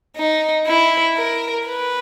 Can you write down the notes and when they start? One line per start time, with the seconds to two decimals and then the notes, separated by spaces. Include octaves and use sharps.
0.17 D#4
0.67 E4
1.17 A#4
1.67 B4